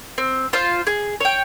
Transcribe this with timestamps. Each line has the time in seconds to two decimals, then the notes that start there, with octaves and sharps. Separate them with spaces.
0.18 C4
0.53 F4 C5 F5
0.87 G#4
1.20 C#5 G5